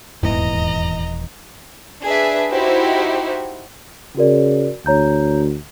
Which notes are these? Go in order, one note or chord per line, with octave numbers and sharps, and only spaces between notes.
D#1 G#1 E2 G#2 E3 D#5 A#5
D4 G#4 B4 E5
D#4 E4 F#4 G4 C5
C#3 F#4 A#4 D5
D2 C#5 A#5 G6